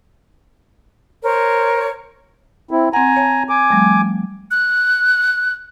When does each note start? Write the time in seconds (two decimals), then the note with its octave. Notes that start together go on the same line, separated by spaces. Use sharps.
1.23 A#4 C5 C#5
2.71 C4 E4
2.93 C4 F#5 G#5 A#5
3.16 C#5 A5
3.49 G#5 D6
3.70 F3 G3 A3
4.51 F#6